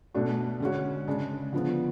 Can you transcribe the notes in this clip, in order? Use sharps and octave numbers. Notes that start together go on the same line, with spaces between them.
B2 A3 D4 F#4
D3 G#3 C#4 F#4
C#3 G#3 D4
D3 F3 B3